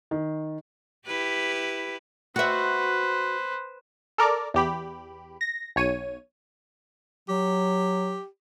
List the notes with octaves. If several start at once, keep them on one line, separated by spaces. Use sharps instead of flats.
D#3
E4 G4 B4
F#4 B4 C5 E5
A4 A#4 D5 D6
E2 G4 B5
A#6
B1 C#5 D#7
F#3 G4